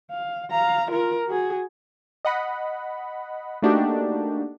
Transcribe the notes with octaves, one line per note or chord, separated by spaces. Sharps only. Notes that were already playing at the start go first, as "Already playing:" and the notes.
F5
F5 A#5
F4 A#4
F#4 G#4
D#5 F#5 B5
A3 A#3 D4 D#4 F#4 G4